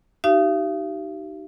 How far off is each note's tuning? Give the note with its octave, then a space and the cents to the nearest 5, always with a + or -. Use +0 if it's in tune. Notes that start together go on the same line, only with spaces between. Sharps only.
D#4 -5 G4 -40 F5 -45